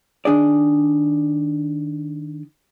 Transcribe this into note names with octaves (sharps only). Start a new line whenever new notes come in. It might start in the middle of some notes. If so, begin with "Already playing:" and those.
D#3 D4 G#4 D5